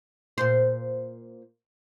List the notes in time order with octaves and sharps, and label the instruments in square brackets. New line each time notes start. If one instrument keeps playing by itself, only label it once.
[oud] A#2 C5